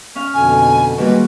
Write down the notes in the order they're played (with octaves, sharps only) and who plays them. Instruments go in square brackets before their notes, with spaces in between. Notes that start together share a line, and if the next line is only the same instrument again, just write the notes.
[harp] C#4 F5 F6
[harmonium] F2 B2 D3 [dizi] G#5
[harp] D#3 G3 A#3 [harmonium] G#3 F#4 [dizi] B4